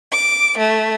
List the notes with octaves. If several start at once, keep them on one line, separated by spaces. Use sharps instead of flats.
D6
A3